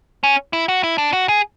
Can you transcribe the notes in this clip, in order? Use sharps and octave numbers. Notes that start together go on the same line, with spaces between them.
C#4
E4
F#4
E4
D4
F#4
G#4